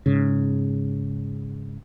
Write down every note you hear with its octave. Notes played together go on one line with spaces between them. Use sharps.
G#2 C#3